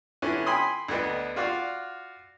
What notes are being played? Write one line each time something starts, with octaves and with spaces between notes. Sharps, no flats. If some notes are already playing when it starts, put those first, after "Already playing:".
D3 B3 C#4 E4
G5 G#5 B5 C6 D#6
D2 D3 B3 D#5
F4 F#4 D5 F5